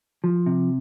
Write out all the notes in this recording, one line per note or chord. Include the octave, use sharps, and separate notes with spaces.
F3
C3